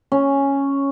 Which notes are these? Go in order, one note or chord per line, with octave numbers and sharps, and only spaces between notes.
C#4